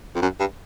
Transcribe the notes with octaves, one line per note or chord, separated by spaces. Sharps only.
F2
F#2
G2